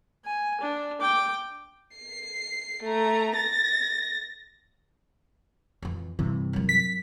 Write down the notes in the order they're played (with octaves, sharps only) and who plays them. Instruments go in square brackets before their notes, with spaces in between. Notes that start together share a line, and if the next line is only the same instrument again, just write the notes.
[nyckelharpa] G#5
D4
G5 D6
[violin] C7
A3 A#5
A6 A#6
[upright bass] F2 E3
[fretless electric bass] G2 C3 E3 [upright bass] E4
[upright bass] F#3 A#3
[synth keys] B6